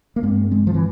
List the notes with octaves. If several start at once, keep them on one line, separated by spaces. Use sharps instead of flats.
A#3
G2 G#3 C4
G#3 C4
F3
E3